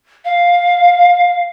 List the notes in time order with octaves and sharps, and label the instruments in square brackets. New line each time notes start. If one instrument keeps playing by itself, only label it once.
[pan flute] F5